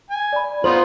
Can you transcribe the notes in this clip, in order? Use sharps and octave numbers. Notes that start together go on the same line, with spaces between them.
G#5
D5 B5
B3 D#4 F4 C5 F#7